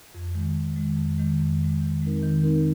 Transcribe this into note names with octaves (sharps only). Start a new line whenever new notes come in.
F2
D#3 G#3
F2
D#3 G#3
F2
D#3 G#3
F2
D#3 G#3
D#3
G#3 C4 D#4 A#4
D#3
G#3 C4 D#4 A#4